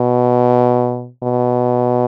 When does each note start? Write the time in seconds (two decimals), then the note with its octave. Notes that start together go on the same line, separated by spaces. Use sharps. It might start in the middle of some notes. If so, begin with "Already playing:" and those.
Already playing: B2
1.23 B2